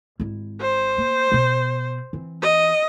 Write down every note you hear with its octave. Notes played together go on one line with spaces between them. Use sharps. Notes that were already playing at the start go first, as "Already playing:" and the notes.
G#1 E4
C5
A#3
B2 B3
E3 C4
D#5